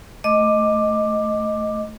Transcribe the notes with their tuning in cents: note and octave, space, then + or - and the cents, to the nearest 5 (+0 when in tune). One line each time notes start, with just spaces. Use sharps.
A3 +0 D#5 +0 D6 +10